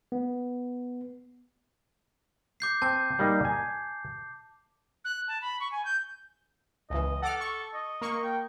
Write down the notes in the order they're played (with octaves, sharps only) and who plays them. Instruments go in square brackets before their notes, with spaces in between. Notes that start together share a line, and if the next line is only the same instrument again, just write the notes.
[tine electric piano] B3
[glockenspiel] D6 G6 C7
[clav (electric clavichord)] C4 [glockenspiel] A5 G6
[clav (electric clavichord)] G3 A#3 D#4
G#5
[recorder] F#6
A5
B5
C#6
G#5
G6
[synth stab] C#2 E3 [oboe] D#5
[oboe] A4 [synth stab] F#5 D6 F6
[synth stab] C#6
[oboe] D#5
[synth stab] A#3 C#6
[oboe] G5